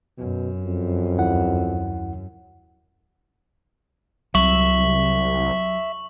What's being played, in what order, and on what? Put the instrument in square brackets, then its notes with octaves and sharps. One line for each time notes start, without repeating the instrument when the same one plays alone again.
[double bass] F#2 [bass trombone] B2
[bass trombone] F2
[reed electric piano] D#2 E4 F#5
[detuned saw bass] C2 [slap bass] F#3 [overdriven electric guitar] E5 [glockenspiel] C#6 F#7